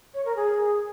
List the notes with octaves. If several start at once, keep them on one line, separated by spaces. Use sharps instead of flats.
C#5
A#4
G#4